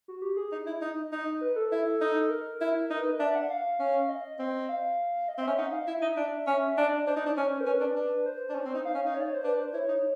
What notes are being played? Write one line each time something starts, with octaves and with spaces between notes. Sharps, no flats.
F#4
G4
G#4
D#4
E4
D#4
D#4
B4
A4
E4
D#4
A#4
E4
D#4 A#4
B4
D4 E5
F#5
F5
C#4
D#5
C4
F5
D#5
C4
C#4 E5
D#4 F#5
F5
E4 E5
D#4
D4
C#4 E5
D4 D#5
D4 C5
D#4
D4
C#4
A#4
C#4 B4
D4
D4
C5
D4
C#4
C4
D#4
F5
C#4
F5
D#4
C#5
D5
C#5
C5
D4 B4
C5
E4 C#5
D#4